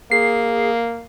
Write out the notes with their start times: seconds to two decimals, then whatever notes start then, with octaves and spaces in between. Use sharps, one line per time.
0.11 A#3 G#4 C7